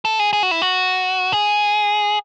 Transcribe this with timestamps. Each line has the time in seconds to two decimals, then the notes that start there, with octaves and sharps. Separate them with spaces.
0.05 A4
0.19 G#4
0.33 G#4
0.43 F#4
0.51 E4
0.62 F#4
1.32 G#4